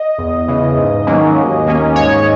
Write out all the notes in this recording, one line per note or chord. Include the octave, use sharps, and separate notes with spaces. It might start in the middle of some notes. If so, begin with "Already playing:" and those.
Already playing: D#5
E2
C#3 E3
G#2
D#3 F#3 A#3 C#4
D#2
D#3 A#3 C#4
G#2 C#5